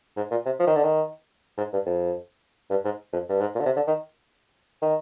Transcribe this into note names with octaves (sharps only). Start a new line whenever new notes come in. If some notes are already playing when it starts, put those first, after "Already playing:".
G#2
A#2
C3
F3
D#3
D3
D#3
G#2
G2
F2
G2
G#2
F2
G2
G#2
A#2
D3
C3
D3
D#3
D#3